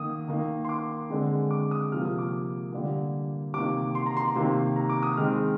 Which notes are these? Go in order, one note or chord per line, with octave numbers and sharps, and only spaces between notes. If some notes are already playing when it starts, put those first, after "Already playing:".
Already playing: D#3 A#3 D#6
D#3 A#3
C6
D6
D3 G#3 C4
D6
D#6
C3 F3 A#3 F6
D#6
D6
D3 G3 A#3
C3 D#3 A#3 D6
C6
A#5
C6
C3 D#3 A#3
A#5
D6
D#6
D#3 G#3 C4 F6